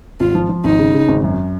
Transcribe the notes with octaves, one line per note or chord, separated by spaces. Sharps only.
G#1 F4
F3
F3
G#1 D#4
C#3
C#3
G#1
F#2